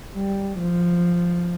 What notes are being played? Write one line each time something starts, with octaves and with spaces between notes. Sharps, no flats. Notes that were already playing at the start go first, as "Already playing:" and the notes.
G3
F3